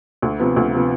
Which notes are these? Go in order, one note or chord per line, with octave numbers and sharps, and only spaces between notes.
D2
C3 F3 B3
D2
C3 F3 B3